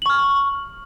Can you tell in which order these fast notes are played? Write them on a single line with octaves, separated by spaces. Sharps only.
F#7 C#6 F6